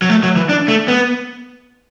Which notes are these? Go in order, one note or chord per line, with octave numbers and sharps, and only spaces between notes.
F#3
A3
F#3
E3
D4
A3
B3